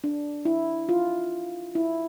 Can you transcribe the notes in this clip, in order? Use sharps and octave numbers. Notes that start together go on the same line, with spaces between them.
D4
E4
F4
E4